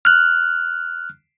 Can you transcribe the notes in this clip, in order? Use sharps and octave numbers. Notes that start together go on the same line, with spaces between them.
F6 F#6